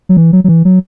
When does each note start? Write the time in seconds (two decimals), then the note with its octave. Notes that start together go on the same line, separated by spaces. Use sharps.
0.09 F#3
0.17 E3
0.33 F#3
0.44 F#3
0.48 E3
0.65 F#3